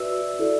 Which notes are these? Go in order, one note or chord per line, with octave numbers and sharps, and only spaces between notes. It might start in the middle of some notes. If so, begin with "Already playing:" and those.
Already playing: F#4 B4 D5 E5 E6
E4 A4 D5